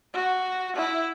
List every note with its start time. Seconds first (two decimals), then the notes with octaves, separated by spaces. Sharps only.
0.14 F#4
0.76 E4